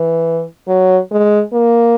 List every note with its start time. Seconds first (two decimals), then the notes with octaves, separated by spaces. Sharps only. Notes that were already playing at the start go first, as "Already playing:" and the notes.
Already playing: E3
0.68 F#3
1.11 G#3
1.53 A#3